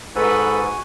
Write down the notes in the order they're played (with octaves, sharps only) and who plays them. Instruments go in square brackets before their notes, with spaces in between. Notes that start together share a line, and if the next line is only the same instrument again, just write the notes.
[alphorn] G#2 [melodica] F#4 F#5 G#5 [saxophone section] A4 B4